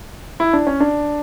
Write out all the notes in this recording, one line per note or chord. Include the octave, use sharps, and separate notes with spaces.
E4
D4
C#4
D4